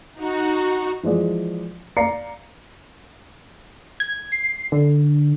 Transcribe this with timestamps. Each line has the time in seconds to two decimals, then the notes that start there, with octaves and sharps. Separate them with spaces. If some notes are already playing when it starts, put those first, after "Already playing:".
0.20 D#4 F#4
1.03 E3 F3 G#3 D5
1.97 D5 F5 A#5 C7 C#7
4.00 G#6
4.32 C7
4.72 D3